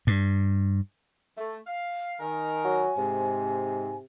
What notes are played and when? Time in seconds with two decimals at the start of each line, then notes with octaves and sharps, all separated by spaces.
0.07 G2
1.38 A3
1.67 F5
2.20 D#3 A#4 G#5
2.64 F#3
2.98 G#2 C3